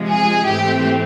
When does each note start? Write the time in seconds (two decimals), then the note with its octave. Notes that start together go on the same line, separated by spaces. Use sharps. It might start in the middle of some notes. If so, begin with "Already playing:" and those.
Already playing: C3 F3 G#3
0.08 G#4
0.46 G#2 E3 A3 C4 G4